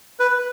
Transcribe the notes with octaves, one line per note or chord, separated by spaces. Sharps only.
B4